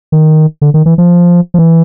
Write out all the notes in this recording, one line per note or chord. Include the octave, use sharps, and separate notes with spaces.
D#3
D3
D#3
E3
F3
F3
E3